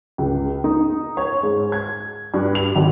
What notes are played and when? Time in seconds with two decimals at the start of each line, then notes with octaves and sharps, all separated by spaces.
0.18 C#2
0.64 D#4
1.17 C#5
1.43 G#2
1.72 G#6
2.34 G2
2.55 F7
2.75 G#1